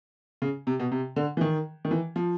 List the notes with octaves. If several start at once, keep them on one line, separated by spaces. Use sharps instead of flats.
C#3
C3
B2
C3
D3
E3
D#3
D#3
E3
F3